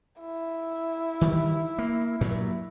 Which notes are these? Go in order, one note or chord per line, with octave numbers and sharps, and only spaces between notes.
E4
D#3 E3 G3
A#3
G2 A#2 F#3